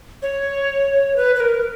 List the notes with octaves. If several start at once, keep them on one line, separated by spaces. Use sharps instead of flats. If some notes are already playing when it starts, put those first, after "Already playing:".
C#5
B4
B4
A#4